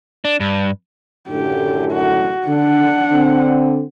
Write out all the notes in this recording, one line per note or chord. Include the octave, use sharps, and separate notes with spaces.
D4
G2
F#2 A2 D3 G4
F#4
D3 D4 F#5
D3 C4